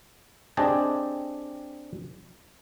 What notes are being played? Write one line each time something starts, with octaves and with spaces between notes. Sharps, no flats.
C4 D4 G4 G#4 D#5 A5